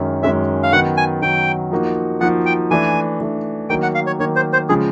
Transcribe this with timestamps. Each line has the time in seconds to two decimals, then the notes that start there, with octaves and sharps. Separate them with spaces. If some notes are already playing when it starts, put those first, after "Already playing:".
Already playing: F#2 D#3 G#3 C#4
0.23 F#2 D#3 G#3 C#4 E5
0.63 F5
0.72 D#3 F#3 B3 F#5
0.97 G#5
1.22 D#3 F#3 B3 G5
1.72 F3 A#3 D#4 F#4
2.21 F3 A#3 D#4 F#4 F#5
2.46 G5
2.71 E3 A3 D4 G#5
3.20 E3 A3 D4
3.69 D#3 F#3 A#3 G5
3.83 F#5
3.95 F5
4.07 C#5
4.19 D#3 F#3 A#3 C#5
4.36 C5
4.53 C5
4.69 C#3 F3 G#3 G#4